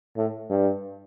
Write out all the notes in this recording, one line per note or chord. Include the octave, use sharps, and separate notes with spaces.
A2
G2